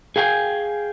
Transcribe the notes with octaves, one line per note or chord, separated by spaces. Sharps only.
G#4 F5 G5 G#5